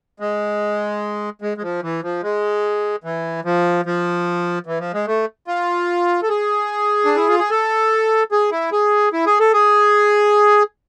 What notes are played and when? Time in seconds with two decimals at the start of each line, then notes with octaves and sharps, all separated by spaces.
0.20 G#3
1.42 G#3
1.57 G#3
1.62 F3
1.82 E3
2.03 F3
2.23 G#3
3.04 E3
3.45 F3
3.86 F3
4.66 E3
4.80 F3
4.94 G#3
5.07 A3
5.47 F4
6.23 A4
6.29 G#4
7.05 D4
7.16 E4
7.28 F4
7.39 G#4
7.50 A4
8.32 G#4
8.52 E4
8.72 G#4
9.13 E4
9.26 G#4
9.40 A4
9.53 G#4